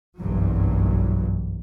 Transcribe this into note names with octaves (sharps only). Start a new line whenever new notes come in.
F#1 B1 G2 E3 F#3